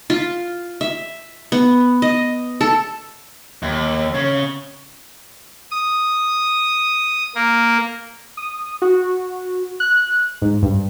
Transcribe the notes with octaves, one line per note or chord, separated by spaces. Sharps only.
F4
E5
B3
D#5
A4
D#2
C#3
D#6
A#3
D#6
F#4
F#6
G#2
G2